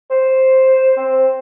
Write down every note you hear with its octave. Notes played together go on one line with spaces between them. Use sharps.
C5
C4